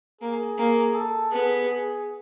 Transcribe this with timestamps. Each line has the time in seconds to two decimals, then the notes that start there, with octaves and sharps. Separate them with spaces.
0.21 A#3 G#4
0.58 A#3
0.95 A4
1.31 B3 G#4
1.68 G#4